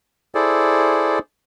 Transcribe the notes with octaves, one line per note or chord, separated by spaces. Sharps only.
E4 G#4 A4 C5 D5